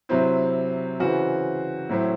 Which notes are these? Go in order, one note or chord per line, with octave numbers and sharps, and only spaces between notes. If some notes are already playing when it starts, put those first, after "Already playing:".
C3 F#3 C4 E4
C#3 E3 C4 F#4
A2 F#3 C4 E4